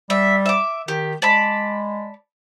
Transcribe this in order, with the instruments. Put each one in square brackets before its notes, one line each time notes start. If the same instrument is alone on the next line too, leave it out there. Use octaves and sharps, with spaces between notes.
[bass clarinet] G3 [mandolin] E5
[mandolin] E5 D6
[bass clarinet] D#3 [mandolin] G4
[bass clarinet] G#3 [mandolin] D5 A5 B5